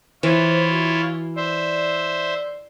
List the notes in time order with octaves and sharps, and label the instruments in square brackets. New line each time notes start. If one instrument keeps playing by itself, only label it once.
[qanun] E3 [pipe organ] E4 F4 C#5 [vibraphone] C5
[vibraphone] F#4
[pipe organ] C5 E5 [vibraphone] D5